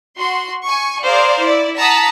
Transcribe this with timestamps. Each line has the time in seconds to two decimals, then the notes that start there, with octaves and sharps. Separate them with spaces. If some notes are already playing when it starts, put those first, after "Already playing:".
0.16 F#4 C6
0.64 G#5 C#6
1.03 G#4 A#4 C5 D5 F5
1.39 E4 D5
1.78 F#5 A5 A#5 D#6 B6